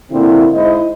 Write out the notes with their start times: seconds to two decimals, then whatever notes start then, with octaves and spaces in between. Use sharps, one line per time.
0.12 A#2 D3 A#3 C4 E4
0.54 G#2 E4 C5 D#5